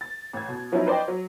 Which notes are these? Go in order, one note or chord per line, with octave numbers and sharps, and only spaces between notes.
A6
A1 G#6
B2
F3 F#3 B3 C#4 D#4 E4
B4 C5 D5 D#5 G5
F#3